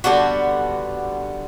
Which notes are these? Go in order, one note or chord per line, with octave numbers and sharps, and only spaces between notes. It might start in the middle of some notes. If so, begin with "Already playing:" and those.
D3 G3 B3 F#4